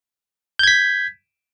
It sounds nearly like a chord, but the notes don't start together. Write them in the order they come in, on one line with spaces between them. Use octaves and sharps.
G6 G#6 B6